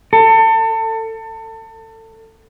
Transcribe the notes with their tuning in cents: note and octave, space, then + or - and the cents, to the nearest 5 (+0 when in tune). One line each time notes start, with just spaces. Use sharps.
A4 +30